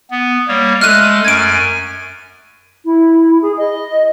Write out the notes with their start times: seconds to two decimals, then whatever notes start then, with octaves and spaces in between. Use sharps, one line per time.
0.11 B3
0.48 G3 A#3 C#5
0.81 G#3 A3 A4 F6 F#6 D#7
1.25 F#2 G#5 G#6 D7
2.85 E4
3.42 G#4
3.58 D#5